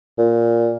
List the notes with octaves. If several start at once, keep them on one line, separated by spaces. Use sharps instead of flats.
A#2